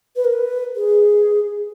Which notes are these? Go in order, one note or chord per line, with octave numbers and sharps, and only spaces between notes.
B4
A#4
B4
G#4